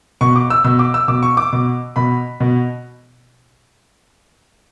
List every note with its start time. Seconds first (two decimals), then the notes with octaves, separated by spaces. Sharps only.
0.21 B2 C#6
0.36 D6
0.50 E6
0.64 B2 E6
0.79 D6
0.94 E6
1.08 B2 D6
1.23 C#6
1.37 D6
1.53 B2
1.96 B2 B5
2.40 B2